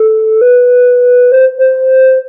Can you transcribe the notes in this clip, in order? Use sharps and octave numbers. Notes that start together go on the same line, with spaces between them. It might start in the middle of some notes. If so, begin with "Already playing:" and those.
Already playing: A4
B4
C5
C5